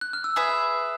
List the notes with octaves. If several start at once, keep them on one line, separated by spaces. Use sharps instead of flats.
F#6
F6
E6
G#4 B4 E5 D#6